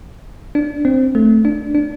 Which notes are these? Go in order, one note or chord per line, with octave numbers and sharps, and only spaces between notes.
D4
C4
A3
D4
D4